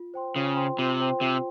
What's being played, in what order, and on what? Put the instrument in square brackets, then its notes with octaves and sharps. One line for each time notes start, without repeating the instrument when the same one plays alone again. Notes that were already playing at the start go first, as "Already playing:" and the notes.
Already playing: [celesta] F4
C5 G5 C6
[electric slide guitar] C#3 [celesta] F4
[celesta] C5 G5 C6
[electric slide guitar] C3 [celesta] F4
[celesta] C5 G5 C6
[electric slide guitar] C3 [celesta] F4